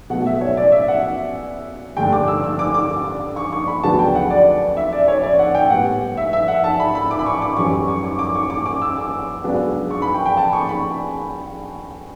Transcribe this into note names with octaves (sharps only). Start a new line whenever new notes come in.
B2 F#3 A3 F#5
E5
C#5
D5
E5
F#5
G2 D3 A3 D4 G5
D6
E6
E6
D6
D6
C#6
C#6
B5
D2 C#3 F#3 B3 D4 A5
G5
F#5
D5
E5
D5
C#5
D5
F#5
G5
A2 G3 B3 F#5
E5
E5
F#5
A5
B5
B5
D6
B5
C#6
D6
F#2 E3 G3 C#4 C#6
C#6
D6
D6
C#6
D6
D6
E6
D6
C#2 C#3 F#3 B3 D4
C#6
B5
G5
G5
A5
C#6
B5